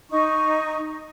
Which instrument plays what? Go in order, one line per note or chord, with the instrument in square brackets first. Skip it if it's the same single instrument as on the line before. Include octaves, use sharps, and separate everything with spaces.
[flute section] D#4 C#6